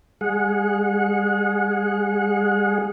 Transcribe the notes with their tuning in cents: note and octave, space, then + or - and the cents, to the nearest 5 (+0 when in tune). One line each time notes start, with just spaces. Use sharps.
G3 +45 G#4 +0 F#5 -30